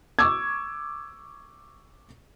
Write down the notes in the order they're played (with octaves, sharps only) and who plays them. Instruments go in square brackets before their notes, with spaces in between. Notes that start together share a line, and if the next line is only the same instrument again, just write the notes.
[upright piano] C#6 D6 E6 G#6